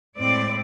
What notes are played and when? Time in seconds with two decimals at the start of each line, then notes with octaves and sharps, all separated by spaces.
0.17 A2 G#3 C4 D5